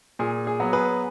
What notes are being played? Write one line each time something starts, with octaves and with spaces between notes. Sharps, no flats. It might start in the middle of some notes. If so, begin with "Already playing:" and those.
A#2 G#4
G#4
F#3 B3
G#4 B4